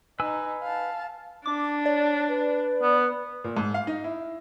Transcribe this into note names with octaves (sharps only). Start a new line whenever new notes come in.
D#4 B4 G#5 E6
F5 A5
D4 D6
C#5 D5
B4
B3
A#2
G#2
F5
D#4
E4